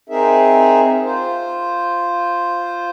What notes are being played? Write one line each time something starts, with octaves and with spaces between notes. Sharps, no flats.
C4 D#4 G#4 A#4 E5
F4 C5